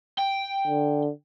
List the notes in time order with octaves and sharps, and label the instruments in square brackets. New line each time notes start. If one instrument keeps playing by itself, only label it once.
[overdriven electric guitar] G5
[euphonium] D3